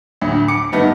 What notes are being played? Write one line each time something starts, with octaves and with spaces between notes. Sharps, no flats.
D2 A2 D3
D6 C#7
G2 D#3 A3 B3